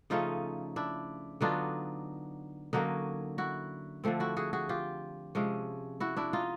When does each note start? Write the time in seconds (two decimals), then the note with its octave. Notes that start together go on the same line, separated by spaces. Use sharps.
0.10 C#3 F3 A3 C#4 D#4 F4
0.76 D4 E4
1.41 D3 F#3 B3 D4 D#4 F4
2.73 D3 F#3 A#3 C#4 D#4
3.38 E4 F#4
4.04 D3 F3 A3 C4
4.20 E4 F#4
4.37 F#4 G#4
4.53 F#4 G#4
4.69 F4 G4
5.35 C3 F3 G#3 C#4
6.00 E4 F#4
6.17 D4 E4
6.33 D#4 F4